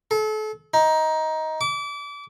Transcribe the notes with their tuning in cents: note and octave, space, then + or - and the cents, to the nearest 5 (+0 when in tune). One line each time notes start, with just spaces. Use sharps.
A4 -35
D#4 +15
D6 -30